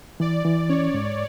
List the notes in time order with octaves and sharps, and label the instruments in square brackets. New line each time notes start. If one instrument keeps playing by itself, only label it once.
[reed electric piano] E3 [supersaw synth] D5
[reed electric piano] E3
[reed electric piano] C#4 [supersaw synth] C#5
[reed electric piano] G#2